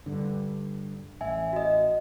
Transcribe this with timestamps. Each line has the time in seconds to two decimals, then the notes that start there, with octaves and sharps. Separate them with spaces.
0.06 G2 D3
1.21 A1 E5 G#5
1.53 F#4 D#5